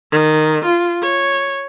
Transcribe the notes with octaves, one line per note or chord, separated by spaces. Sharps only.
D#3
F4
C#5